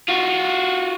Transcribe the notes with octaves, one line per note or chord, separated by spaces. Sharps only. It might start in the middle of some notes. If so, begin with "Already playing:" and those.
F4 F#4